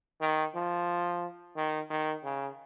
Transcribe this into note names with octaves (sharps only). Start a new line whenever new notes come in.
D#3
F3
D#3
D#3
C#3